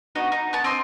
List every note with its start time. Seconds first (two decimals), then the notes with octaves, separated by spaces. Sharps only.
0.15 B3 D#4 F#4 D#5
0.32 D#4
0.53 B3 A5
0.64 C4 D#5 C6 D#6